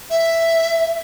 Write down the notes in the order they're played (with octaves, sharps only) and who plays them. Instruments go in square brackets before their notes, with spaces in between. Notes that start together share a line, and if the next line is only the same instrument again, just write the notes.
[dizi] E5